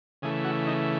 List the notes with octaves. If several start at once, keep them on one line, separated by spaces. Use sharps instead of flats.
C#3 E3 A3 G#4
F#4
D#4